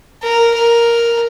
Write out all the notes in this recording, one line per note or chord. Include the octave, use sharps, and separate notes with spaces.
A#4
A#4